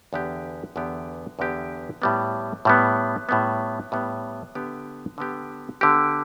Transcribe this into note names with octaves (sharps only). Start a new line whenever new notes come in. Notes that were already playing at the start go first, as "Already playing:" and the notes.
E2 D3 B3 G4
E2 D3 B3 G4
E2 D3 B3 G4
A2 G3 B3
A2 G3 B3
A2 G3 B3
A2 G3 B3
D3 B3 G4
D3 B3 G4
D3 B3 G4